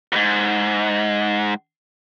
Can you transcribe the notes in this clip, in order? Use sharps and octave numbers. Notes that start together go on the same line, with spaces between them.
F2 G#2